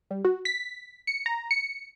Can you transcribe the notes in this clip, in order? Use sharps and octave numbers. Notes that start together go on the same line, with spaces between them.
G3
F#4
B6
C#7
A#5
C#7